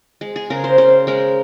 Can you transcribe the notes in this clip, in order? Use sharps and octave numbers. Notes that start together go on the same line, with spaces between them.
G#3
G#4
C#3 A#4
C5
C#3 C5
G#3 A#4